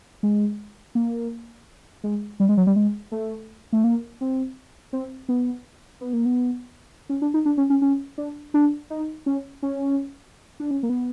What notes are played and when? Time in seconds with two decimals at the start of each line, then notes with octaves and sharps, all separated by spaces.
0.23 G#3
0.95 A#3
2.04 G#3
2.40 G3
2.49 G#3
2.57 F#3
2.67 G3
2.76 G#3
3.12 A3
3.73 A3
3.84 A#3
4.21 C4
4.93 C4
5.29 B3
6.01 B3
6.13 A#3
6.25 B3
7.09 C#4
7.22 D4
7.34 D#4
7.46 D4
7.58 C#4
7.70 C#4
7.82 C#4
8.18 D4
8.54 D4
8.90 D#4
9.26 C#4
9.63 C#4
10.60 D4
10.71 C#4
10.83 A#3
10.89 B3